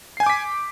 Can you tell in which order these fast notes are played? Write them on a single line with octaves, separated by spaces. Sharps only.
C7 G#5 G6 D6 B6